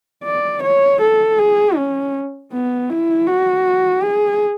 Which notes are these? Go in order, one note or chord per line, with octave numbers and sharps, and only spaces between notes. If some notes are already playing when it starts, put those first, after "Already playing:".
D5
C#5
A4
G#4
C#4
B3
E4
F#4
G#4